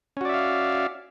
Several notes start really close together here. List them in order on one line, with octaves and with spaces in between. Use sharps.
C#4 F#4 D5 E5 F5